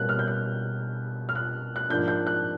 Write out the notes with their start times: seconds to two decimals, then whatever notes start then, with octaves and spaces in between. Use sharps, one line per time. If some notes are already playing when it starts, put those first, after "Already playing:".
Already playing: B2 G3 A#3 C#4 F#6
0.09 F6
0.19 G6
0.28 F#6
1.29 F6
1.35 F#6
1.76 F#6
1.90 G#2 F3 A#3 D4 G6
2.08 G6
2.27 F#6